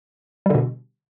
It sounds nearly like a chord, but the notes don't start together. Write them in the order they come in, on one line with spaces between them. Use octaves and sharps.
G3 D3 B2